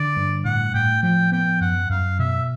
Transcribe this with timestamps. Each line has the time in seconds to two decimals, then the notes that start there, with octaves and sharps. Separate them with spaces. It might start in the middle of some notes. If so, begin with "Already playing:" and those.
Already playing: D3 D5
0.16 G2
0.45 A2 F#5
0.74 A2 G5
1.03 F3 G5
1.32 B3 G5
1.61 F#2 F#5
1.90 F#2 F5
2.19 B2 E5